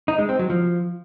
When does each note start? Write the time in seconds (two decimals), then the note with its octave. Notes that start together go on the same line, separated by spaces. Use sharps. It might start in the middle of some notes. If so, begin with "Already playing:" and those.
0.08 D#4
0.18 G#3
0.29 C4
0.39 F#3
0.50 F3